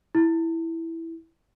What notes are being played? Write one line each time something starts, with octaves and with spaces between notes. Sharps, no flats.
E4